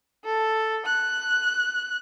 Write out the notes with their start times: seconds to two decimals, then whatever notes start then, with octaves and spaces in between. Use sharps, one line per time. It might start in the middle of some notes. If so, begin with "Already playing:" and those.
0.25 A4
0.86 F#6